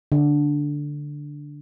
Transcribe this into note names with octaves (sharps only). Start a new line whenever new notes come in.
D3